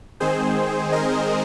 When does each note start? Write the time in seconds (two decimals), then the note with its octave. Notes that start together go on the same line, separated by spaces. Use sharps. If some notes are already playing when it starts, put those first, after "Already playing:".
0.20 D#3 G#3 C4 G#4 C5
0.92 A#4 D#5